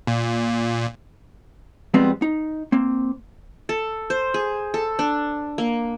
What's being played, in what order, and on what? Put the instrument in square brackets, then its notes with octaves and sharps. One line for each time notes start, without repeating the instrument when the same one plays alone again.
[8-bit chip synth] A#2
[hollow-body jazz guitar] F3 G3 G#3 B3 C4
D#4
A#3 C4
[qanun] A4
C5
G#4
A4
D4
A#3